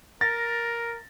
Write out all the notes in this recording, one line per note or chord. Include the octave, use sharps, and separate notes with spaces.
A#4 A6 A#6